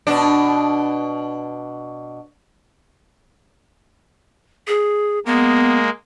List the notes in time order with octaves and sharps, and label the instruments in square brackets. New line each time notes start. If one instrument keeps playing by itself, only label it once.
[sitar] B2 D4
[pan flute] G#4
[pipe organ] G#3 A#3 [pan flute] B3